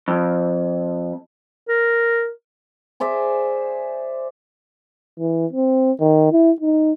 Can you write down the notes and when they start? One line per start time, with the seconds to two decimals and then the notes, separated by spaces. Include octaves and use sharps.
0.08 F2
1.68 A#4
3.00 G#4 C5 D5 E5
5.19 E3
5.53 C4
6.00 D#3
6.32 E4
6.60 D#4